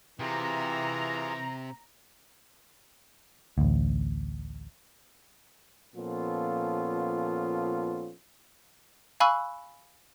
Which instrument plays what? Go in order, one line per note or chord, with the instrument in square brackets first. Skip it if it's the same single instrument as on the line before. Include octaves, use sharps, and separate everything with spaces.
[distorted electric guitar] C3 [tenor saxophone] E3 [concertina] F4 G#4 [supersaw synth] A#5
[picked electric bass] A1 D2
[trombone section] A#2 F3 B3 C#4 F4 A4
[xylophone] F5 G#5 B5 C#6 E6 F#6